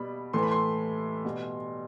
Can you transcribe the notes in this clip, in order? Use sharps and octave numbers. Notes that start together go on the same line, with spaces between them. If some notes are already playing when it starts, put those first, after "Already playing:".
Already playing: B2 G3 B5
A2 E3 A3 C6
B5
C6
B2 G3